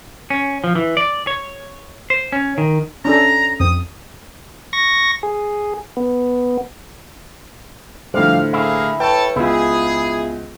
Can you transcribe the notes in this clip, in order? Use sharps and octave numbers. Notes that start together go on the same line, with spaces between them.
C#4
F3
E3
D5
C#5
C5
C#4
D#3
C#4 D4 A4 A#5
F2 C4 D#6
C#6 A#6
G#4
B3
A2 D3 F3 G3 C5 F5
A#3 E4 G#4 F5
A4 B4 C#5 G5 A5
C#2 B3 E4 F4 G#4